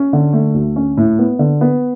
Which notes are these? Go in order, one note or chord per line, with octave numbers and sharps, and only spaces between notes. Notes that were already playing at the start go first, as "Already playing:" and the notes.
Already playing: C#4
D3
A3
D2
C#4
A2
B3
D3
B3